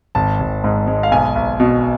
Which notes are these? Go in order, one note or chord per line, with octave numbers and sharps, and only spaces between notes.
G#1 A5
G#1
G#2
G#3
F5
B1 G#5
B1
B2